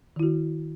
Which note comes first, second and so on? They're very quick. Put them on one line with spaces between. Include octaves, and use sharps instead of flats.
D#3 E4 F#4